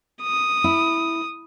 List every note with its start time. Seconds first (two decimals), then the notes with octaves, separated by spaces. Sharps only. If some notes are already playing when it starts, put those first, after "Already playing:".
0.22 D#6
0.64 E4